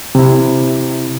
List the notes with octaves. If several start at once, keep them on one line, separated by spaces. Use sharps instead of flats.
C3 E4